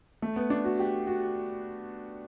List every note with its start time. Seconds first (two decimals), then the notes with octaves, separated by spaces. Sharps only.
0.22 A3
0.36 B3
0.50 D4
0.65 F#4
0.79 G4
1.07 F#4